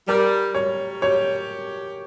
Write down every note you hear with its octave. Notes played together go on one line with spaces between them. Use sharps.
G3 A#4
G3 C#5
G4 C#5